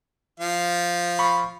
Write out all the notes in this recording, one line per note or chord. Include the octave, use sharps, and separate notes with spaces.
F3 F5
B5 C#6